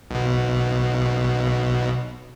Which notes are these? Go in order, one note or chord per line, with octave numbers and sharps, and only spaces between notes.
B1 B2